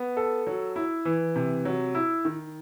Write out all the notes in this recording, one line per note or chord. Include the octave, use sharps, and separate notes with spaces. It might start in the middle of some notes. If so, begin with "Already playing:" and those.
Already playing: B3
A4
F#3
E4
E3
C3
F#3
E4
D#3